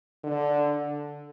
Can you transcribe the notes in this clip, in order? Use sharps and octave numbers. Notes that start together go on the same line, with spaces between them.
D3